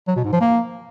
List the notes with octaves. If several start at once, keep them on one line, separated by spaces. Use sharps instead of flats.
F#3
B2
G#2
F3
A#3